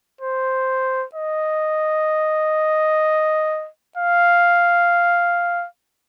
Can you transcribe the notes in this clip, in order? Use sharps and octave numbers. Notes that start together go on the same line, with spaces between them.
C5
D#5
F5